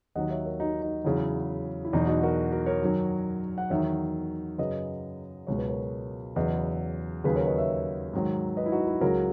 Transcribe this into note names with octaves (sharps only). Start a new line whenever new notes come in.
D#2 D#3 F#3 D#5 F#5
C#5 E5
A#4 C#5
D#4 F#4
D#4
E2 C#3 F#3 E4
E4
E2 B2 F#3 D#4
D#4 F#4
F#4 A#4
F#4 A#4
A#4 C#5
F#2 D#3 F#3
F#5
E2 D#3 F#3 C#5 E5
F#2 C#3 F#3 B4 D#5
C#2 B2 F#3 C#5
B4
A#4 C#5
E2 C#3 F#3 B4 D#5
D#2 C#3 F#3 G#4 B4
A#4 C#5
B4 D#5
C#5 E5
G#2 D#3 F#3
B4 D#5
E4
D#4 F#4
E4
C#2 C#3 F#3 F#4 A#4